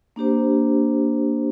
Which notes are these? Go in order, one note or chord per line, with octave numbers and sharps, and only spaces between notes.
A#3 D4 G4 C5